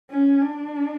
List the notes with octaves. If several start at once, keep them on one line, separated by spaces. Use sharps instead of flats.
C#4
D4